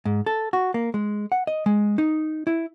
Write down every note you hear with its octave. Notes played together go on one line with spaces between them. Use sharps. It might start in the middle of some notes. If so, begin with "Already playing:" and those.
G#2
A4
F#4
A#3
G#3
F#5
D#5
G#3
D#4
E4